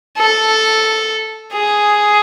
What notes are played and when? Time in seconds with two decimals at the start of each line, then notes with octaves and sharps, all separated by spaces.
0.17 A4
1.53 G#4